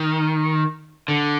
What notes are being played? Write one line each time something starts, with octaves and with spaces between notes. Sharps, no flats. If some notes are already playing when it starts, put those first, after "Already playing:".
Already playing: D#3
D3